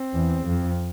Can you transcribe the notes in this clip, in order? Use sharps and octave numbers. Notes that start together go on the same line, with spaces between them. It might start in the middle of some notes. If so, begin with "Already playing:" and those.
Already playing: C4
E2
F2